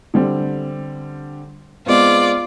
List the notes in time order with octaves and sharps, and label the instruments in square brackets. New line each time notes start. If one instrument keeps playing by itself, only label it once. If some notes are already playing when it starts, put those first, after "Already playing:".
[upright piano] D3 G3 C4
[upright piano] G#3 B3 C4 [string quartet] F4 D5